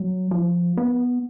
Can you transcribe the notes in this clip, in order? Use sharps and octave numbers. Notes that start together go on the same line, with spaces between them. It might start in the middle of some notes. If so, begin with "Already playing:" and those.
Already playing: F#3
F3
B3